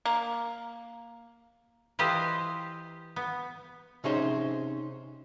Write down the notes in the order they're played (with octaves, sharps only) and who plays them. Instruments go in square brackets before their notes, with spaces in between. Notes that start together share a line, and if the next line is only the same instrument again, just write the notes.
[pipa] A#3
[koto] E3 F4 G4 B4 C5 D#5
B3
[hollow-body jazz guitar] C3 C#4 D#4 G#4 C5